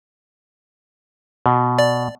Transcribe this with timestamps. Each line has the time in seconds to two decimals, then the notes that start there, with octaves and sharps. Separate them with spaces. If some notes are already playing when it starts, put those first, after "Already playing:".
1.46 B2
1.79 D5